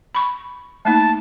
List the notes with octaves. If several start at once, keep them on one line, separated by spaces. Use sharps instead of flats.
B5 C#6
A3 A#3 D#4 A5